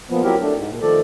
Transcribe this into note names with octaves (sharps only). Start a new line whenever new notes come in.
A#2 F3 B3
F#3 C4 E4 G4 A#4
A3 D4
G#2
A#2
D#3 F3 A3 A4 D5